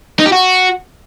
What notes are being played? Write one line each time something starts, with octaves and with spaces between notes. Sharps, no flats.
D#4
G4
F#4